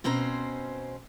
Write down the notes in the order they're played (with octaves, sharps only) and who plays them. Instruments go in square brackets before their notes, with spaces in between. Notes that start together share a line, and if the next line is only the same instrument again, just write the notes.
[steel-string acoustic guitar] B2 C4 C#4 C5 A#5